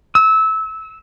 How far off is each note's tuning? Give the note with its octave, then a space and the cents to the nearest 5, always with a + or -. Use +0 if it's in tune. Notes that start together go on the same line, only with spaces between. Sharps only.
E6 -20